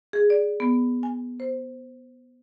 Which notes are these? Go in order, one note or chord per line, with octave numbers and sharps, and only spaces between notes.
G#4
D5
B3
G#5
C5